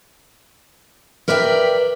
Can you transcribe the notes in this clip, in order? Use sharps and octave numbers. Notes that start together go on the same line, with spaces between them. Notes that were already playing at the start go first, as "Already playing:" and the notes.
A#4 B4 D5 E5 G5